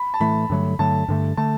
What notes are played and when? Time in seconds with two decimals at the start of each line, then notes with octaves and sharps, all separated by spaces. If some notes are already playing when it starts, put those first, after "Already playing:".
Already playing: B5
0.14 A5
0.20 A2 E3 A3 B5
0.50 G2 D3 F#3 A3
0.79 G2 D3 F#3 A3 A5
1.08 G2 D3 A3
1.37 D3 A3 A5